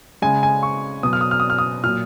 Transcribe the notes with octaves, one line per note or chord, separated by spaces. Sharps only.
C#3 G#3 G#5
G#5
C#6
B2 F#3 D#6
F6
D#6
F6
D#6
F6
D#6
A#2 F#3 F6